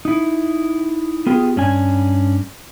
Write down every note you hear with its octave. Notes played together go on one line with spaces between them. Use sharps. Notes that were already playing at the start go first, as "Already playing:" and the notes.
D#4 E4
B3 F4 G4 G#4
G2 C#4 D4 G#5